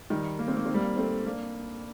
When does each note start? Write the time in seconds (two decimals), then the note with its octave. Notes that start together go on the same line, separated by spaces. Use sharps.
0.10 D#3 G3
0.39 A#3
0.48 C4
0.57 A#3
0.66 C4
0.74 G3 A#3
0.97 A3 C4
1.25 A#3 D4